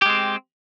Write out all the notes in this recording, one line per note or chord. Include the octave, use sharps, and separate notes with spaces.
G#3 C4 G4